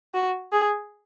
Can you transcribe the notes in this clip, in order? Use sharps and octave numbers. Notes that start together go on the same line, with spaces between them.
F#4
G#4